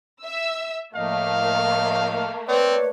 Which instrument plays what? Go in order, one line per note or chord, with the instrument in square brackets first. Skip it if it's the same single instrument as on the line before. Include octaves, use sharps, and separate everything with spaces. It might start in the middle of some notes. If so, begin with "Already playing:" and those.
[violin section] E5 E6
[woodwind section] A2 F3 D#5 [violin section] A3 A#3 [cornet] F5
[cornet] C4 [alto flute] B4 [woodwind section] C#5 D5